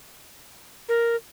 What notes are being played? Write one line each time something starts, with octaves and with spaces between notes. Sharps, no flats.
A#4